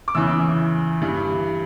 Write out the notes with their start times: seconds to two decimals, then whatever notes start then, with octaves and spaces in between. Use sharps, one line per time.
0.08 D6
0.15 E2 C#3 E3 E6
1.01 G2 E3